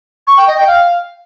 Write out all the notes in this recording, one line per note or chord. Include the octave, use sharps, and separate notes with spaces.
C#6
G5
D#5
G5
F5